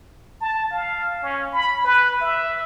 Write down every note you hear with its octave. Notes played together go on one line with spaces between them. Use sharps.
A5
F5
C#4
B5
B4
E5